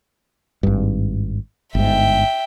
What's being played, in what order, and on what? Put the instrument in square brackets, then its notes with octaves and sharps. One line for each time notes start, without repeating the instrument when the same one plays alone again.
[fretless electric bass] G#1 G2
[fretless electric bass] G1 G#2 [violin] E5 G5